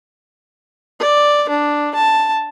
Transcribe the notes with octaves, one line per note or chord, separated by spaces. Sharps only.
D5
D4
A5